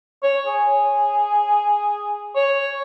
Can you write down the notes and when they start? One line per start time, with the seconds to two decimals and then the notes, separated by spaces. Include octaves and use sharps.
0.23 C#5
0.47 G#4
2.36 C#5